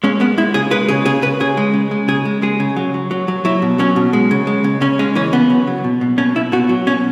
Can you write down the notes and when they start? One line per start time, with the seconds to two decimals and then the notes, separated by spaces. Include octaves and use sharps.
0.04 G#3 C#4
0.20 G#3 B3
0.38 G#3 E4
0.54 C#3 G#4
0.71 G#3 B4
0.89 C#3 G#4
1.06 C#3 G#4
1.22 C#3 B4
1.40 C#3 G#4
1.57 G#3
1.74 C#3
1.91 G#3
2.08 C#3 G#4
2.25 G#3
2.42 G#3 G#4
2.60 C#3
2.77 F#3
2.94 F#3
3.11 F#3
3.28 F#3
3.45 F#3 E4
3.62 B2
3.79 F#3 C#4
3.96 B2
4.13 G#3
4.31 C#3
4.47 G#3
4.64 C#3
4.81 C#3 C#4
4.99 G#3 C#4
5.15 E3 C#4
5.33 C#3 B3
5.50 F#3
5.67 F#3
5.84 B2
6.01 B2
6.18 B2 C#4
6.35 B2 E4
6.52 B2 F#4
6.69 F#3
6.86 B2 C#4